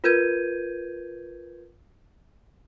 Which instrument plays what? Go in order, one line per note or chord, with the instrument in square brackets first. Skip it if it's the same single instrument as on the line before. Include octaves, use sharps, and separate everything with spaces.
[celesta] F4 A#4 B4 G6 G#6 D#7